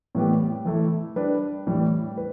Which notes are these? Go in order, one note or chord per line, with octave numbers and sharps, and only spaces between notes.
A2 E3 G3 B3 G4
E3 A3 E4
G3 D4 B4 D5
A2 E3 G3
B4